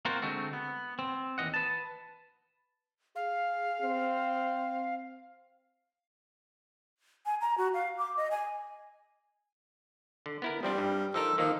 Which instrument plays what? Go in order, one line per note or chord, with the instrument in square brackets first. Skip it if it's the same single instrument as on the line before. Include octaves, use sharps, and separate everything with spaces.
[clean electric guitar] A#3 C4 F4 F#4 A#4 C5
D3 G#3 A3 C4 F#4
B3
C4
D#2 E3 D#5 F#5
B4 A5
[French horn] G#4 [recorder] F5
[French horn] C4
[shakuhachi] G#5
A#5
F#4
F5
D6
D#5
G#5
[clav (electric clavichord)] D3
B3 E4 A#4
[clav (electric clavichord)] F3 C4 D4 [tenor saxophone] G3
[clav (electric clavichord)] G2
[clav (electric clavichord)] F3 D#4 A#4 [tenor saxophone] A4
[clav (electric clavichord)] D#3 A#3 D#4 [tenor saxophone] F3